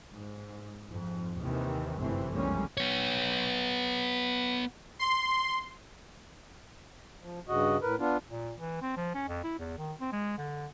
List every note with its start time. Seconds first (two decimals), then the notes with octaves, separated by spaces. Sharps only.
0.12 G#2
0.88 F2 G#2
1.38 D#2 C3 D#3 E3
1.98 G1 F#2 C3 E3 A3 C4
2.33 B1 F2 G3 G#3 A#3 C#4
2.77 B3 C#5
4.99 C6
7.21 F3
7.48 G2 C#3 F#4 D#5
7.82 A2 A#4 B4
7.99 B3 D4 F4
8.30 A#2
8.58 E3
8.82 C4
8.96 F3
9.14 C#4
9.28 F2
9.44 E4
9.59 E2
9.78 D#3
10.00 C4
10.12 G#3
10.38 D3